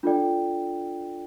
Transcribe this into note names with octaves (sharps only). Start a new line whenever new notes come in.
D4 F4 A4 D5 G5